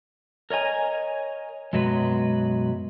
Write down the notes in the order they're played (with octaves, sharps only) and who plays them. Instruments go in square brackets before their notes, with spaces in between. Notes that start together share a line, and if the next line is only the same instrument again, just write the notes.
[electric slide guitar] A#4 C#5 D#5 G#5 A#5
F#2 B2 F#3 G#3 B4